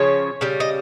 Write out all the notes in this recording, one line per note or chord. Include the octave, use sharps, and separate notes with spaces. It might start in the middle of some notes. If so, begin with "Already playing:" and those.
Already playing: C#3 F3 C#5
C#3 G3
D#5